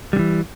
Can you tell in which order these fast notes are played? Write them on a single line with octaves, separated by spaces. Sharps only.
G3 D3 E3